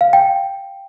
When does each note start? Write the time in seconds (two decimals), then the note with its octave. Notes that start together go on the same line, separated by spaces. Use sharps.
0.01 F5
0.13 G5